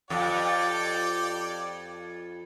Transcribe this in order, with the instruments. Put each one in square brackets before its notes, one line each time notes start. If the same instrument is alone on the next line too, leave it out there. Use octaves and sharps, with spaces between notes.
[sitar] F2 [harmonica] G4 D5